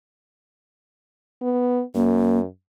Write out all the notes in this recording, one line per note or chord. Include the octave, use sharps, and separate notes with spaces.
B3
F#2 A#3